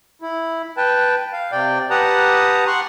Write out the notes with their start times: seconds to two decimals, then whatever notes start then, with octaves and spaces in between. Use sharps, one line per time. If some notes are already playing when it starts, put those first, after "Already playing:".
0.22 E4
0.77 B4 G5 A5
1.33 F5
1.52 C3 D5 G5
1.90 G4 B4 F#5 A5 A#5 D#6
2.67 F#5 C6 C#6 F#6